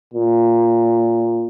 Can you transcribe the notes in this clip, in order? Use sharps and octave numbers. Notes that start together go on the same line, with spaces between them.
A#2